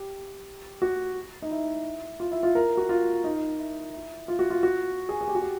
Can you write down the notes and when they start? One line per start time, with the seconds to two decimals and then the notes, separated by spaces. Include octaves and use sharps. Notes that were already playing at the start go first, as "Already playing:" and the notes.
Already playing: G4
0.82 F#4
1.42 D#4
1.51 E4
2.20 F4
2.32 E4
2.43 F4
2.55 A#4
2.77 F#4
2.89 F4
3.24 D#4
3.59 E4
3.93 E4
4.28 F4
4.39 F#4
4.50 F4
4.63 F#4
5.09 G#4
5.21 G#4
5.28 G4
5.35 F#4
5.42 G4